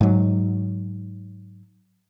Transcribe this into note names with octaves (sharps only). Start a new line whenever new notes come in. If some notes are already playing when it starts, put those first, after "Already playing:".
G#2 F#3